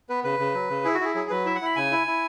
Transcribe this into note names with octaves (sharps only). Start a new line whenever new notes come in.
B3 B4
C#3 B4
C#3
F#3
C#3
E4 G#4
F#4
E4 G#4
F#3 G#4
F#3 B4
E4 E5
F#5
E4 B5
C#3 G#5
E4
E4